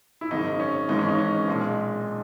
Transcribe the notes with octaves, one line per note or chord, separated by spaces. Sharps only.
E4
G#1 F#2 C#3 D#4
C#4
G#1 G#2 E3 G#3 D#4
C#4
D#4
C#4
B1 A#2 G#3